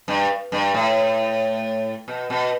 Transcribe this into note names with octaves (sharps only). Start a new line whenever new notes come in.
G2
G2
A2
B2
B2